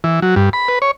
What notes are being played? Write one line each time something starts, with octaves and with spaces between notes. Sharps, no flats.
E3
F#3
G2
B5
B4
C#5